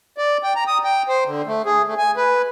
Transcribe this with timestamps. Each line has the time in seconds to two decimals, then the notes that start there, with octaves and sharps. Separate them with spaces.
0.18 D5
0.43 G5
0.56 A#5
0.67 D#6
0.84 G5
1.08 C5
1.26 D3
1.47 A3
1.66 G#4
1.87 A3
1.98 G#5
2.17 B4